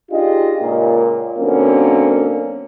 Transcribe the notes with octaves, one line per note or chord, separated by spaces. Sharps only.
D4 D#4 F4 G4 G#4 D#5
C#2 A#2
B2 D3 F#3 A#3 C4 C#4